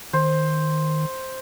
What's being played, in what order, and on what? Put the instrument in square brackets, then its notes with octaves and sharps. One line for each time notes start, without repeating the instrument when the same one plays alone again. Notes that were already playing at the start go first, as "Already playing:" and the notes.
[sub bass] D#3 [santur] C5